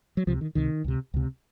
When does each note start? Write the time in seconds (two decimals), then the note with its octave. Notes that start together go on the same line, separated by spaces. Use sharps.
0.17 F#3
0.27 C#2 C3 F3
0.41 D#3
0.55 C#2 C3 D#3
0.84 C#2 C3
1.14 C#2 C3